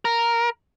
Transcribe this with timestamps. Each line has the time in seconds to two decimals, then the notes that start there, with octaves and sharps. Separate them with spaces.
0.05 A#4